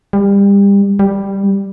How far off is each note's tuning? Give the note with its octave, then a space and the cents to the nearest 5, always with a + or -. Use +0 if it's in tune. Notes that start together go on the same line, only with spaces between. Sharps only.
G3 +30
G3 +5